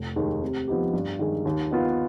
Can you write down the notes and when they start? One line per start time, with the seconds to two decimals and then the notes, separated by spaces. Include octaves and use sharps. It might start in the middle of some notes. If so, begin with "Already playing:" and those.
Already playing: F1
0.16 D#2 D#3 G#3
0.42 C3
0.68 F3 B3 D#4 G4
0.94 G2
1.19 D#3 G#3
1.45 D#2
1.71 D#3 B3 F4